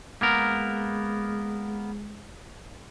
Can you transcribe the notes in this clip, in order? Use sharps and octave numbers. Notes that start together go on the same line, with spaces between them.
G#3 A#3 B3 A#4